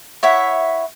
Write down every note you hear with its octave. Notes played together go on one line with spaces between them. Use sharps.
E4 C#5 E5 F#5